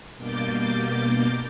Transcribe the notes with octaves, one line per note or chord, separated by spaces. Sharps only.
G2 B2 A#3 D6 G6 A6